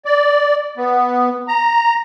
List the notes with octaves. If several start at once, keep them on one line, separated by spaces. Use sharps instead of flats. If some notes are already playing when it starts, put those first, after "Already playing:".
D5
B3
A#5